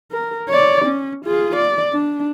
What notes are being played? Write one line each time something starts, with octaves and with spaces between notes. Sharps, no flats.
A#4
C#5 D5
C#4
F4 G#4
D5
D4